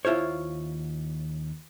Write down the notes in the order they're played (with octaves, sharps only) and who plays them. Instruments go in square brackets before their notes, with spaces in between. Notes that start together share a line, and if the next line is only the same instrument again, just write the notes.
[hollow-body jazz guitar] D#2 E4 F4 C5 C#5